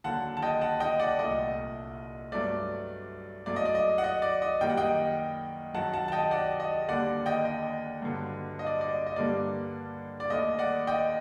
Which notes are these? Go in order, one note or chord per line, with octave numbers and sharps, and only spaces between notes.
D#2 D3 F#3 F#5 A5
A5
D#5 G5
F#5 A5
D#5 G5
D5 F#5
C2 A#2 A3 D#5
G2 F#3 A3 D5
F#2 F#3 A3 D5
D#5
D5
D#5
F#5
D#5
D5
D#5
F#2 D#3 G3 A#3 G5
F#5
D#5 G5
F#2 D#3 F#3 F#5 A5
F#5 A5
A5
D#5 G5
D5 F#5
D#5
D#2 D3 G3 A#3 D5 F#5
D#5 G5
D#5
G2 D3 F#3
D#5
D5
D5
D#5
D#5
G2 D3 G3 A#3 D5
D5
D#2 D#3 A3 D#5
D5 F#5
D#5 G5